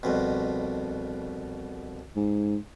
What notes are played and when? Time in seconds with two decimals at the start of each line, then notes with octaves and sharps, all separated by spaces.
0.03 C2 F2 B2
2.16 G#2